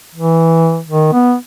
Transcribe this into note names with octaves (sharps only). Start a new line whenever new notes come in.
E3
D#3
B3